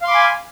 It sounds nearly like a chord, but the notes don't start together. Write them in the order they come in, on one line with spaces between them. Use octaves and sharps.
F5 C6 D6 B5 G#5